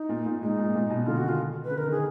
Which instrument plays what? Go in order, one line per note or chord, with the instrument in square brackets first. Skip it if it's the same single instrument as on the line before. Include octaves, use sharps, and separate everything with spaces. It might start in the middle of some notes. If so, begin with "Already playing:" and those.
Already playing: [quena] D#4
[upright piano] A#2
A#2
[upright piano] G#2 [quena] D#4
[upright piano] A#2
A#2
B2
[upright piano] D3 [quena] F4
[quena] F#4
[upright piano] D#3
[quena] F4
B4
[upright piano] D3
[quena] A#4
[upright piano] D#3 [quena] G#4